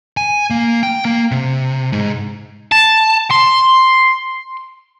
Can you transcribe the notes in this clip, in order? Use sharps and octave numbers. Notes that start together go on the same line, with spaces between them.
G#5
A#3
G5
A#3
C3
G#2
A5
C6